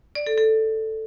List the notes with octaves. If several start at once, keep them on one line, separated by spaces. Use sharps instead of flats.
D5
A4
A4